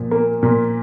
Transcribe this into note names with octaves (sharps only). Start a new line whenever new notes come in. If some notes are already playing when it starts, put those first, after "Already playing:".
Already playing: A#2 F3
A#3
A#2